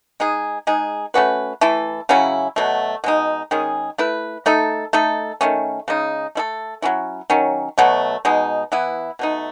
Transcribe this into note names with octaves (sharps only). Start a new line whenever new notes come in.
G#3 D#4 G#4
G#3 D#4 G#4
A3 C#4 F#4 B4
E3 A3 E4 A4
C#3 F#3 C#4 E4
B2 F#3 A3
B2 G#3 D#4
D#3 G#3 C#4 G#4
A3 E4 B4
A3 D#4 A4
A3 D#4 A4
D#3 A3 C#4
C#3 G#3 D#4
A3 E4 A4
F#3 C#4 E4
D#3 F#3 C#4
B2 F#3 A3
B2 G#3 D#4
E3 B3 E4
B2 A3 D#4